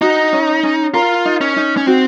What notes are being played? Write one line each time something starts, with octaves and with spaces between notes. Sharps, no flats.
D#4 F#4
C#4
C#4
F4 A#4
D#4
C#4
D#4
C#4
C4 F#4